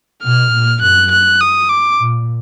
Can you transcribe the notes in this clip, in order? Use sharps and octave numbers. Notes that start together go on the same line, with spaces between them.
B2 F6
A#2
F#2 F#6
F#6
D#6
D6
A#2